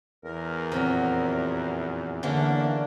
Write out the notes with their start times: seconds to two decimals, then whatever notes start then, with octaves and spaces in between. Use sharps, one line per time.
0.24 E2 A#4
0.72 F2 A#2 F#3
2.23 D3 E3 A#3 C#4 D4